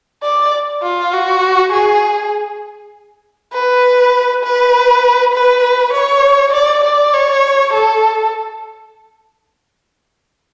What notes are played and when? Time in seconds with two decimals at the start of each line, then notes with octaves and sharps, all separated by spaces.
0.23 D5
0.83 F4
1.13 F#4
1.73 G#4
3.53 B4
4.44 B4
5.33 B4
5.93 C#5
6.54 D5
6.84 D5
7.14 C#5
7.73 A4